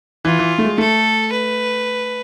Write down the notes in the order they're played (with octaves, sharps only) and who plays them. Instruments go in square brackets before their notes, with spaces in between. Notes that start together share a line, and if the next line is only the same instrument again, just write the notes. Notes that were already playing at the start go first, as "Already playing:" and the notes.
[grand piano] E3 [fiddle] F4
[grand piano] E3
A3
G#3
[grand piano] A3 [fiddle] A4
[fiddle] B4